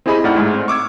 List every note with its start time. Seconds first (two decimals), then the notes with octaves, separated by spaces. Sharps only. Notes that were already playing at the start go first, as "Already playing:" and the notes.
0.06 C4 E4 G4 G#4 D#5 B5
0.24 A2 D#4 E4 D5 F#5 F6
0.36 G#2 G#3 A3
0.54 C4
0.68 C#6 D6 E6 G#6